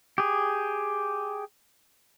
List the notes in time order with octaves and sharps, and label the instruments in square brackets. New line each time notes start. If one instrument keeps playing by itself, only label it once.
[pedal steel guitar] G4 G#4